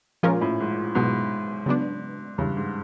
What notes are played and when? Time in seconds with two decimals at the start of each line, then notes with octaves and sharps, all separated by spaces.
0.23 A#2 F3 G#3 C#4 F4 A#4
0.41 A2
0.60 G#2
0.95 G#2 B2 F#3 B3
1.66 C#3 F#3 B3 D4
2.38 E2 G2 C#3 E3
2.57 G#2